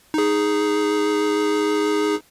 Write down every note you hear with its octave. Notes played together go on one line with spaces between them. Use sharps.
D#4 G#4